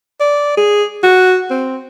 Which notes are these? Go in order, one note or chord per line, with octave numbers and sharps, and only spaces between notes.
D5
G#4
F#4
C4